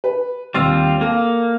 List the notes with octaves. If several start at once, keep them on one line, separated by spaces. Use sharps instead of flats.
B4
D#2 G3 C4 F4 E6 A6
A#3 A4 F5